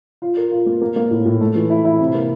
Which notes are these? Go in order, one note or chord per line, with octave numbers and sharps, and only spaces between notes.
F4
A#4
F4
A#3
A#3
A#3
A2
A2
A3
E3
E4
E4
C3
A#3